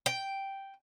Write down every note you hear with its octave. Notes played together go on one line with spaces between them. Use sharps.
G5